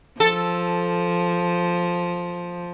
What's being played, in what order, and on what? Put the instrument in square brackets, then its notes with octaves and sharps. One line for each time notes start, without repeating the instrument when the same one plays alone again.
[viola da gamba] F3 [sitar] A4